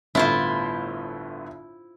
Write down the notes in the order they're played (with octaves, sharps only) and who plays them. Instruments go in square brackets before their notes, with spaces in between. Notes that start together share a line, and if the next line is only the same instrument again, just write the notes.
[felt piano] G1 A2 B3 [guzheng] E4 F4 C5